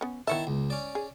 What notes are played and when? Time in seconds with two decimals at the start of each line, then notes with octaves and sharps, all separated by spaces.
0.01 B3 C#4
0.27 D#3 B3 E4 C#5 E5 A5
0.47 C#2
0.70 C#4 D5
0.95 G#4